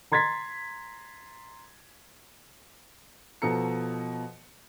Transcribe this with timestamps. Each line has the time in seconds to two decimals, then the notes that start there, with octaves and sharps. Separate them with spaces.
0.12 A#5 C6 G#6 A6 B6
3.42 B2 F3 F#4 A4 A#5 C#7